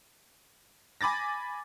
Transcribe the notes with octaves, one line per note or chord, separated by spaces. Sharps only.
G#5 B5 D6 A6 A#6